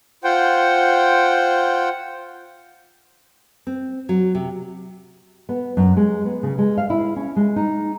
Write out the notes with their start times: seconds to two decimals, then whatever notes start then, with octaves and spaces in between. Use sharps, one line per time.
0.24 F4 C5 F#5 G5
3.67 C4
4.09 F#3
4.35 C3
5.49 B3
5.77 F#2
5.97 G#3
6.25 B3
6.43 C#3
6.58 G#3
6.78 F5
6.90 E4
7.16 C#4
7.36 G#3
7.56 D#4